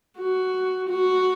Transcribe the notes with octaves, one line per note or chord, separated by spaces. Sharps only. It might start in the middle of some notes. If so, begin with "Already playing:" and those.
F#4
F#4